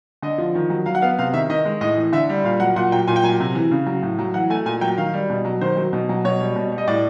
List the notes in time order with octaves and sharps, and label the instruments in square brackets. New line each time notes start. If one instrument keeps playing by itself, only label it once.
[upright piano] D3 D#5
F3
D#3
F#3
F#3 F5
F#5
B3 F5
C3 F5
D#3 E5
D#3 D#5
G#3
A2 D#5
E3
D3 E5
G3
A#2 F5
F#3 F#5
A#2 F#5
F#3 G5
A#2 G#5
G5
F#3 G#5
C3
E3
C#3
F#3
A2
F#3
E3 F#5
A3 G#5
A#2 G#5
F#3 G5
D#3 F5
G3
B2
F#3
D#3 C5
F#3
B2
F#3
B2 C#5
G3
B2
G3
D#5
A2 D5